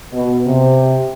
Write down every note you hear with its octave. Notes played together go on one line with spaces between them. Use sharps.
B2
C3